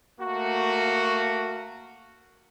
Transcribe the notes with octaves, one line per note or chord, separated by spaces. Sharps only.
A3 A#3 F#4